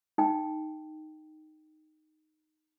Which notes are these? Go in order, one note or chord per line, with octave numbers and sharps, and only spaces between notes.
D#4 G5